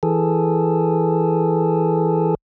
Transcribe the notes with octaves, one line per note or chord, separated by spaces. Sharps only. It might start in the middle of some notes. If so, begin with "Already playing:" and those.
E3 G#4 A4